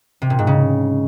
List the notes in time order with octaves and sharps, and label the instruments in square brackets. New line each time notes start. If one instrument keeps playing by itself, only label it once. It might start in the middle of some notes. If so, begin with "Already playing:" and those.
[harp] C3
A#2
G#2
C#3